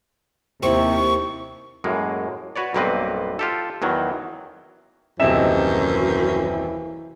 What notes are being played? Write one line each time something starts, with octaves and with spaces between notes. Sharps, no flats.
D#2 C3 C4 E4 C#6
F#2 A2 G#3 A#3
F#4 B4 C#5 D5
B1 G2 A#3 C4 B4 D#5
F4 G4 A4
E2 D#3 E3 F#3
D#1 F#2 C3 E3 D#4 E5 G#5 E7